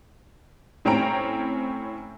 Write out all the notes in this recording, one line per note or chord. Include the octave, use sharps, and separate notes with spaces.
A2 C4 C#4 G5 A#5 D7